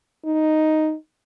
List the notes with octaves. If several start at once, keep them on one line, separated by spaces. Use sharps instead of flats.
D#4